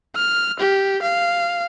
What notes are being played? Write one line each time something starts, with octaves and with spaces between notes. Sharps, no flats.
F6
G4
F5